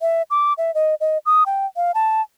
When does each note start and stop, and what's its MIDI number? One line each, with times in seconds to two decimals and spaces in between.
0.01 0.22 76
0.31 0.53 86
0.58 0.74 76
0.75 0.95 75
1.01 1.18 75
1.26 1.44 87
1.46 1.66 79
1.76 1.92 77
1.95 2.21 81